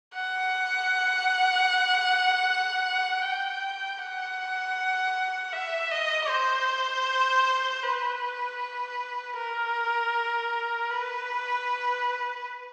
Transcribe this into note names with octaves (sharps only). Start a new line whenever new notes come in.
F#5
G5
F#5
E5
D#5
C5
B4
A#4
B4